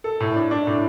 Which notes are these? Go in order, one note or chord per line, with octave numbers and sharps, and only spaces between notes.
A4
A2
D4
D4
A2